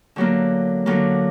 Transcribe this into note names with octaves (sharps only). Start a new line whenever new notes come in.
D3 F#3 A#3
D3 F#3 A#3